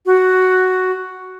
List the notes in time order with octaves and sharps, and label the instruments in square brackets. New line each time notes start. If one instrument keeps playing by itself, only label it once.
[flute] F#4